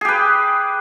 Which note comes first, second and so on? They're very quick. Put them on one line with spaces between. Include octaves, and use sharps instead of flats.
G#4 G4 B4